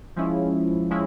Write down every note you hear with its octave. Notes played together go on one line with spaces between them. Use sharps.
F3 G#3 C#4 E4
F3 G#3 C#4 E4